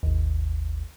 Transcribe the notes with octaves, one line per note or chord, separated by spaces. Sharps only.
G#1 D#2